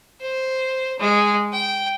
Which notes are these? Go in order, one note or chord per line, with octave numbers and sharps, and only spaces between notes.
C5
G#3
G5